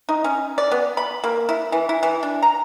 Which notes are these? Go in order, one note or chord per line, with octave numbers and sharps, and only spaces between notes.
D#4
C#4
D5
B3
B5
A#3
E4
E3
E4
E3
D4
A#5